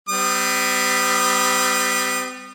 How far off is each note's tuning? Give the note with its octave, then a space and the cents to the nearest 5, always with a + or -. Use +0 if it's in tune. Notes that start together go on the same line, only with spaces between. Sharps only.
G3 +0 C4 -45 D#6 -30